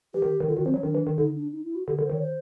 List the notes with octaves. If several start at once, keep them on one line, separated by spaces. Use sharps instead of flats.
E3 G4
D#3
D#3
D3 F4
D#3 F#4
F3 C4
F#3 C#4
D#3 D4
E3
D#3
D3 D#4
D4
D#4
E4
F#4
D3 G4
A#4
D3
C5
D#3 C#5
C5